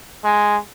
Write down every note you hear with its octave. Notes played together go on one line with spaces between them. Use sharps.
G#3